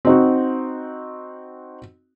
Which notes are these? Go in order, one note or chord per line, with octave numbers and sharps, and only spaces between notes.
C4 D#4 F#4